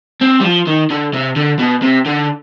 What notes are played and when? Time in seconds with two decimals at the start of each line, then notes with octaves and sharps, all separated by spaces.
0.22 C4
0.41 G3
0.44 F3
0.67 D#3
0.91 D3
1.14 C3
1.36 D3
1.59 B2
1.82 C3
2.06 D3